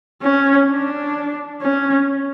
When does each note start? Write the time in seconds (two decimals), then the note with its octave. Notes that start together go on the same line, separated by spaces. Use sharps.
0.23 C#4
0.70 D4
1.62 C#4